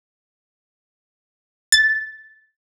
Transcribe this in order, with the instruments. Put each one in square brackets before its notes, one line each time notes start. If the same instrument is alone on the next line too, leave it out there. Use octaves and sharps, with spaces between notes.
[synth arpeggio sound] A6